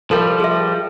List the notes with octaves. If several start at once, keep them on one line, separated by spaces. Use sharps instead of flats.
F3 G3 A4 A#4
G#4 E5